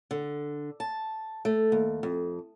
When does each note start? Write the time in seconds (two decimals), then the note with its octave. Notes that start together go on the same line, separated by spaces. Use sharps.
0.11 D3
0.80 A5
1.45 A3
1.72 D#2
2.03 F2